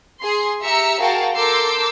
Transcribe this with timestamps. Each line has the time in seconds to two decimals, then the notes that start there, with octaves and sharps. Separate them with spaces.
0.20 G#4 C6
0.62 G4 E5 A#5 E6 C#7
1.00 F#4 G#4 A#4 F5 G5 A5
1.35 A4 A#4 C6 D6 E6 G6